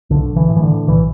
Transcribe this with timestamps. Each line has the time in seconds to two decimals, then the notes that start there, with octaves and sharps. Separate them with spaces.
0.10 B1 D3
0.36 E3
0.49 A2
0.56 E3
0.63 D3
0.87 B1 E3